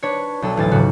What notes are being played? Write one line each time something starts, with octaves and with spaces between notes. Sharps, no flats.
D4 B4 C#5
B1 D4 A4
A1 D2 A6
D#1 G#2 C#3 F#4